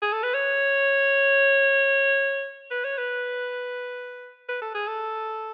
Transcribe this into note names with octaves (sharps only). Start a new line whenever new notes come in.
G#4
A4
B4
C#5
B4
C#5
B4
B4
A4
G#4
A4